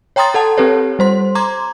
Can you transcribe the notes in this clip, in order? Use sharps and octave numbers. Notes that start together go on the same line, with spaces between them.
C#5 G5 A#5 C6 D#6 A6
A4 F#5 A5
C4 G4 A4 B4 C#5
G3 C5 C6
A#5 C6 D6 G#6